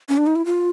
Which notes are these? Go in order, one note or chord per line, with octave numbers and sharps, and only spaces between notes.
C#4
D4
D#4
E4
F4